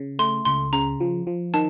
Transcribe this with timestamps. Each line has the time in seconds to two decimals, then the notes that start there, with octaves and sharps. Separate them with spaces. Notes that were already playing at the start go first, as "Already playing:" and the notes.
Already playing: C#3
0.19 A3 C6
0.45 C#2 C6
0.73 C#3 A#5
1.00 F3
1.27 F3
1.54 D#3 A5